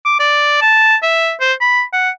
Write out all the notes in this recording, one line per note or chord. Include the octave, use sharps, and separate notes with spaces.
D6
D5
A5
E5
C5
B5
F#5